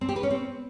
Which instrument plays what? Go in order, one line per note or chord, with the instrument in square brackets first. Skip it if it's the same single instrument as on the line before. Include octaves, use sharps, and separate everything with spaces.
[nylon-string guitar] C4
G4
B4
C#4
C4